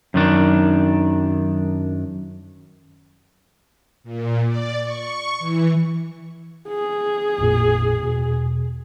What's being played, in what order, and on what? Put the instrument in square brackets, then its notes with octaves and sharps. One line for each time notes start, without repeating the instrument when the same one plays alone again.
[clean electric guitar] F#2 D#3 D4
[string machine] A#2
D5
C#6
E3
[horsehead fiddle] G#4
[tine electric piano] A1 F2 A#2
E2 B2